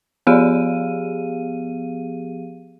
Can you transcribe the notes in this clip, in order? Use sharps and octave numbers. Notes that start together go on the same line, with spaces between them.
F3 B3 G4 G#4 F5 D#7